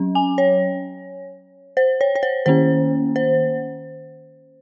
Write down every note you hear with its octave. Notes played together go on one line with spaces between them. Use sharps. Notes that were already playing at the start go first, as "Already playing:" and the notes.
Already playing: F#3 C#4
G#5
C#5
C5
C#5
C#5
C5
D#3 A#3 C#4 C5
C5